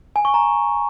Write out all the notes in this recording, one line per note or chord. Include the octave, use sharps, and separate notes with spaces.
G#5
C#6
A#5